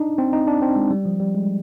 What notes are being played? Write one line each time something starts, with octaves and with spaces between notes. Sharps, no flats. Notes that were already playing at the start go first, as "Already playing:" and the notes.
Already playing: D4 D#4
C4
D#4
D4
C4
G#3
G3
F3
G3
G#3